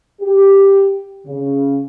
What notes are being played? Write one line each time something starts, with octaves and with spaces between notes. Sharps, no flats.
G4
C#3